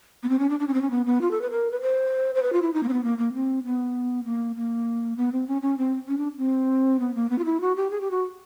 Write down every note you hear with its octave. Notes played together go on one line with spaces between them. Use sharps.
B3
C4
C#4
D4
D4
C#4
C4
C#4
B3
B3
F4
A4
B4
A#4
B4
C5
C5
B4
F4
E4
D#4
A#3
C4
B3
A#3
A#3
C4
B3
A#3
A#3
B3
C4
C#4
C#4
C4
C#4
D4
C4
B3
A#3
B3
F4
E4
F#4
G4
G#4
G4
F#4